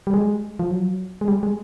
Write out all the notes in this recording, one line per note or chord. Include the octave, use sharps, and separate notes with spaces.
G3
G#3
F3
F#3
G#3
G3
G#3